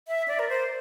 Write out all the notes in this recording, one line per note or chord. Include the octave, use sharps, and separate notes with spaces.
E5
D5
A#4
C5